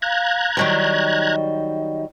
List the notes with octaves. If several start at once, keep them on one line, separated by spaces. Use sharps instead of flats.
F5 A#5 F#6 G#6
D#3 F#3 G3 D#5